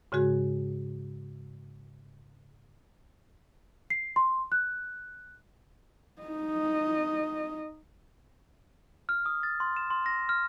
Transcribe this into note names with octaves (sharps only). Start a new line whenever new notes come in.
G#2 C#3 G#3 F#4 G#4
C7
C6
F#6
D#4 D#5
F6
D#6
A6
C6
E7
C6
A#6
F6